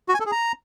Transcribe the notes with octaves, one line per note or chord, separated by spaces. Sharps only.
F#4
G#5
A4
G#4
A#5